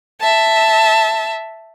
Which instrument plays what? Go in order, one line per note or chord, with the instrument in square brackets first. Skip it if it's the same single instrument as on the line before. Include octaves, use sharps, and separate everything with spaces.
[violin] E5 A5